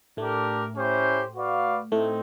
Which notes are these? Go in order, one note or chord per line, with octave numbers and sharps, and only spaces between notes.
A2 A3 D4 G4 A#4
C#4 E4 G4 C5
F#4 B4 D5 F5
A2 A3 C4 D#4